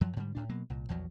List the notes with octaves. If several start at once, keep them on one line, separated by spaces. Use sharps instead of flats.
F#2 F3 F#3
G#2 D3 F#3 G3
D2 A2 D4
B2 F#3 A#3
C2 A#2
A#1 E2 F3 F#3